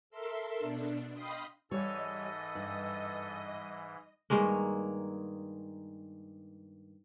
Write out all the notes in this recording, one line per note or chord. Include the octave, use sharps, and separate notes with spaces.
A4 A#4 E5 C6
B2 D4
D#5 F5 G5 B5 C6 D#6
G#2 E3 G3 A4 C#5 D#5
G2
G2 D#3 G#3 A#3